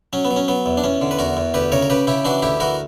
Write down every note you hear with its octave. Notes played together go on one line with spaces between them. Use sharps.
F#3 C#4
B3
F#3
C#4
F#3 B3
E2
D4
E2 C#4
D3
B4
E2 F#4 A#4
E2
D2 G4 B4
C#3 A#4 C#5
A#4
C#3 G4 B4
C#3 E4 G4
E3 D4 F#4
D2 E4 G4
E3 F#4 A#4